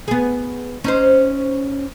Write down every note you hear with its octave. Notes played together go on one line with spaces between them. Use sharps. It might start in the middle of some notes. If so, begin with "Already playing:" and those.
B3 G#4
C#4 D#4 C5